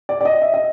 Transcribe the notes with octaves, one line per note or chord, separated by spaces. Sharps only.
D5
D5
D#5
E5
D#5